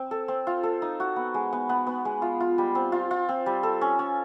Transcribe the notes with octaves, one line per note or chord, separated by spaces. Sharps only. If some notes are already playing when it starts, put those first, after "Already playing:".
Already playing: C4
A4
C4
F4
A4
D#4
F#4
B3
G#3
B3
B3
B3
G#3
F4
F4
G3
C4
F4
F4
C4
G3
A4
C#4
C#4